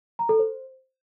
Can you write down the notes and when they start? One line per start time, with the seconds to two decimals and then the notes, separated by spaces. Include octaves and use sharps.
0.19 A#5
0.29 A4
0.39 C5